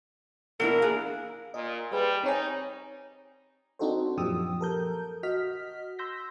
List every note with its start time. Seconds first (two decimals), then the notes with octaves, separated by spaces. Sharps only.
0.60 B2 D4 E4 A#4
0.82 A#3 D4 G#4
1.54 A#2 D#5
1.92 G3 G4 G#4 B4
2.24 C4 D#4 C#5 G#5
3.79 C4 D4 D#4 F#4 A4 C5
4.17 F#2 A#2 F3 G4 D#6 E6
4.61 A4 A#4 G6
5.23 F#4 D#5 F6 B6
5.99 C6 E6 G6 A#6 B6